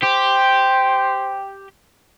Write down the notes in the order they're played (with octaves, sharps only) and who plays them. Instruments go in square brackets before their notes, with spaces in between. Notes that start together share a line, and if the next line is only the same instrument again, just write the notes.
[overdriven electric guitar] G4 [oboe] C5